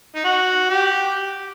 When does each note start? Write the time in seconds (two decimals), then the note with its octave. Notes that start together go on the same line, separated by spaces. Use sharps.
0.16 D#4
0.25 F#4
0.70 G4